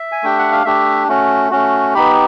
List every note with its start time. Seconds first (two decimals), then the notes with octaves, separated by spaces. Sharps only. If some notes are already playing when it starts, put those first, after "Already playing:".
Already playing: E5
0.12 G#5
0.23 A3 D4 G4 G5
0.39 F#5
0.52 F5
0.65 A3 D4 G4 E5
1.08 A3 C#4 F#4
1.51 A3 C#4 F#4
1.94 B3 D#4 G4 B5